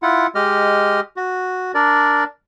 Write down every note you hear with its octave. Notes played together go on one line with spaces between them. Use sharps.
E4 F4 F#5
G#3 G4 D#5 F6
F#4
D4 A#4 D5